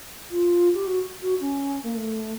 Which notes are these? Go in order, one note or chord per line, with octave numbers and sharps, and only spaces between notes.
F4
G4
F#4
F#4
C#4
A#3
A3